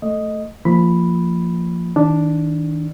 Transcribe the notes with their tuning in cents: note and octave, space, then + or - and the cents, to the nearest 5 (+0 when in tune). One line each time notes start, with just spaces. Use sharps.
A3 +0 D#5 +0
F3 -15 A#3 -20 B5 +0
D#3 +35 D4 +0